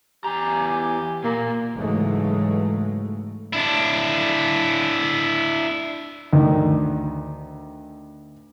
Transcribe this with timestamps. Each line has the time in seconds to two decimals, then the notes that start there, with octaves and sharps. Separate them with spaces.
0.24 E2 G4 G#5 A#5
1.24 A#2 A#3
1.74 G#2 C#3 E3 F#3 G#3 A3
3.53 D4 E4
6.33 D2 D#3